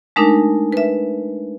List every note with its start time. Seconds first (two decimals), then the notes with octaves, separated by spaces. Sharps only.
0.16 G#3 A3 D4 D#4 A#4
0.72 B4 E5